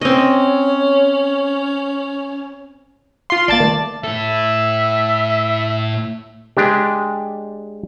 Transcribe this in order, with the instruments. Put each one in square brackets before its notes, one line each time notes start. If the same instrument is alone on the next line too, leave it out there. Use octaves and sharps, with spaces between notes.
[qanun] C4 D#5 [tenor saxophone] C#4 [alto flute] C#5
[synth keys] F4 C6 [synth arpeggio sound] F5
[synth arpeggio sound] G#1 A#3 [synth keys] D5 A5 A6
[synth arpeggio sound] D#3 G3 A3
[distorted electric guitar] A2 A4 [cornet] E5
[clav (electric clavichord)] G#3 D4 G4